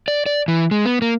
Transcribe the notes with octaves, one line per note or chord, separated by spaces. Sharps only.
D5
D5
E3
G#3
B3
A#3